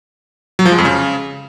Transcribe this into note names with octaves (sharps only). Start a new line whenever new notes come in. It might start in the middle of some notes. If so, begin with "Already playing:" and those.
F#3
F3
G#3
F2
C#3